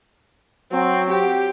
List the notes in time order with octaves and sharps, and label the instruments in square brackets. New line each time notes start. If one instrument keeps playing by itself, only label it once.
[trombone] F#3 [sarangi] C4
[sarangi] G4